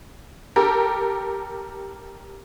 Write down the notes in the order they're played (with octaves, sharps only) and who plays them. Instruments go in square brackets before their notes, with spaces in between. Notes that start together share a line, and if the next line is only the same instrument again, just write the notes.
[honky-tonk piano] G4 A4 A#4